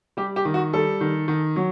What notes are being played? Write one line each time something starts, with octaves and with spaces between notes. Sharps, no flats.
G3 G4
G4
D#3
F#4
G3 A4
D#3
D#3
F#3